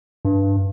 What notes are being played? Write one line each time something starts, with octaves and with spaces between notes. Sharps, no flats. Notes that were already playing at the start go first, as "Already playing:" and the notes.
G2